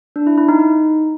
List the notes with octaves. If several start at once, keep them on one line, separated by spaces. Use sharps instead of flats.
D4
E4
E4
D#4
D#4